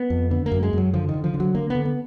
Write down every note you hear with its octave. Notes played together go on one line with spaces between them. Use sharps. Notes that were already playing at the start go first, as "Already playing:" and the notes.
Already playing: B3
F2
D3 B3
A#3
F#2
G#3
F#2 F#3
D3 F3
D#3
D3
F3
D3
F#3
D3 A#3
D3 B3
B3